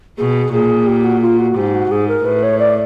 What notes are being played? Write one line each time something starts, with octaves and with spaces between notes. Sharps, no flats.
B2 G#4
A#2 G#4
G4
F#4
F4
F#4
G#2 G4
F#4
G#2 G#4
A#4
A2 B4
C#5
D5